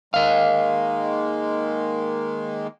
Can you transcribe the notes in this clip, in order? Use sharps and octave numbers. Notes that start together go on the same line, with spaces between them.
D#3 G#3 A#3 D#5 F5